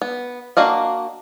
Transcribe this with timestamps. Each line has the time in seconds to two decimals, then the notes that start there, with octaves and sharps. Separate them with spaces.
0.02 B3
0.57 A#3 D4 F#4 D#5 F5